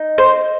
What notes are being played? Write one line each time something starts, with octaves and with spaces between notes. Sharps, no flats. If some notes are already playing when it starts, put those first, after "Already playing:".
Already playing: D#4
C5